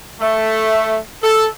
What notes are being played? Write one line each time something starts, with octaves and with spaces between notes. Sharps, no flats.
A3
A4